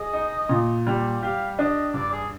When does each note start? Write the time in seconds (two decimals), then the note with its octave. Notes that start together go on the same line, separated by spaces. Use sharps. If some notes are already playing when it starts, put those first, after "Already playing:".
Already playing: G#4 D#5
0.13 D#4
0.49 A#2
0.87 G3
1.22 G4 F5
1.59 D4 D#5
1.94 G2 D5
2.12 G#4